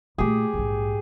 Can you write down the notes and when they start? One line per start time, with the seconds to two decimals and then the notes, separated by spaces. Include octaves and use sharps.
0.18 A#2 A3 G4 G#4
0.54 A#1 G#2